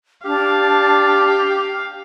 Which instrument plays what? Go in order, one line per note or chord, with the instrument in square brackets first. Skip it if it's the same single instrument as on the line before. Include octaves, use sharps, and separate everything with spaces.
[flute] D4 [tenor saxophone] G4 [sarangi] F5